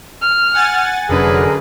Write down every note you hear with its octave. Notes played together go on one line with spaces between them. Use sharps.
F6
F#5 G#5 A6
F1 F#2 D3 G#4 A#4 B4